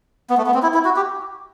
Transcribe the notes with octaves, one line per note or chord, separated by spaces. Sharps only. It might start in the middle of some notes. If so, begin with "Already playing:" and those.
B3
A3
B3
C4
E4
E4
F#4
G4